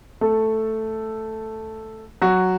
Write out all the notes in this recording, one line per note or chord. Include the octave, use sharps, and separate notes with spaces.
A3 A4
F#3 F#4